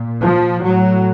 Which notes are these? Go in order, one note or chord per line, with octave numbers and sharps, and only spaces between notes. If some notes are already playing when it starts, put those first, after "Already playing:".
Already playing: A#2
F3
A2 F#3